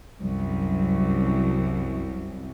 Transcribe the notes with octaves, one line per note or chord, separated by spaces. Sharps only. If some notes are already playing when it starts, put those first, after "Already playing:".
C2 F#2